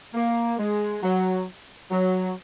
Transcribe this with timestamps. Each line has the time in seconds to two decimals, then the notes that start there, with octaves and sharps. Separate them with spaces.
0.14 A#3
0.58 G#3
1.03 F#3
1.91 F#3